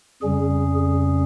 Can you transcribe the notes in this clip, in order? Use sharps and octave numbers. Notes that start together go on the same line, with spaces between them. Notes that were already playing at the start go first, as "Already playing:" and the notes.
F2 C#3 G3 C#4 G#4
G#4